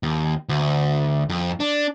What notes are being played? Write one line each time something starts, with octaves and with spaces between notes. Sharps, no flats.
D#2
D2
F2
D4